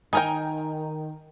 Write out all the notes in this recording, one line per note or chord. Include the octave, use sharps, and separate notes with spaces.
D#3 D#4 A#4 G5 G#5